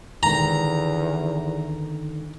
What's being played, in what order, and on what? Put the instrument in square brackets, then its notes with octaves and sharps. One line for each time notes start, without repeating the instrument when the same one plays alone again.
[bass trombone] E2 [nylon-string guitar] D3 D#3 [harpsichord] A#5